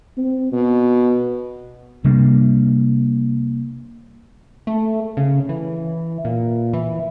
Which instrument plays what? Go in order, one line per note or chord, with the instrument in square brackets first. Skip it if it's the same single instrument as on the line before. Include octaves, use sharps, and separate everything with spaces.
[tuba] C4
B2
[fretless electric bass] C3 G3 A#3 D4
[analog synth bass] A3
C#3
E3
A#2
E3